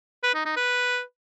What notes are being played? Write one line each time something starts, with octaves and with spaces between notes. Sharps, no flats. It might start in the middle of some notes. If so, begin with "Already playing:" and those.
B4
D#4
D#4
B4